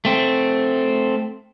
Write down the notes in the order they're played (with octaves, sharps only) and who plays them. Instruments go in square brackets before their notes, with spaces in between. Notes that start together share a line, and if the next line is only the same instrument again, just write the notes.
[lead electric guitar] A3 C4